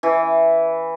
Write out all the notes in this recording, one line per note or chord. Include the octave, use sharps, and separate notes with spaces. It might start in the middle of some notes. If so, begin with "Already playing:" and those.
E3